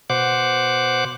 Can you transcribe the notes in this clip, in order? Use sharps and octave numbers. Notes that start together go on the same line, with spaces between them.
B2 C5 F#5 D6